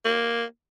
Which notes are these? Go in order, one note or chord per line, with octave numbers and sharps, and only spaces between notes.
A#3